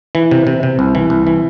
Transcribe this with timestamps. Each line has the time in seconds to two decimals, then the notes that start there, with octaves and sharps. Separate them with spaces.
0.15 E3
0.31 C3
0.47 C3
0.63 C3
0.79 C2
0.95 E3
1.10 C2
1.27 E3